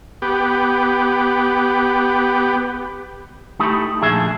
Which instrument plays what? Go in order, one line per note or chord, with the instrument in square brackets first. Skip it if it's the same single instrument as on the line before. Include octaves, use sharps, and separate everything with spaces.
[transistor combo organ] B3 G4
[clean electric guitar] A3 D#4 E4 G4 A4
A#2 D3 F3 A3 G#4 E5